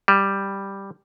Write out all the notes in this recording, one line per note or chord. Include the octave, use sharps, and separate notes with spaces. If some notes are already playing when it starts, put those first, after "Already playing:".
G3